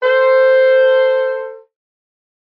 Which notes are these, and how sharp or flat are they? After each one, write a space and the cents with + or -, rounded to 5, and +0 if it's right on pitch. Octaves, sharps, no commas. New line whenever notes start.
A4 +20 C5 +0